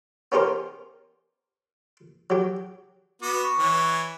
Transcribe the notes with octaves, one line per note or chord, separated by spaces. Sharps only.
B3 C#4 D#4 G4 A#4 C5
F#3 G4
B3 F#4 D6
C#6
E3 C#5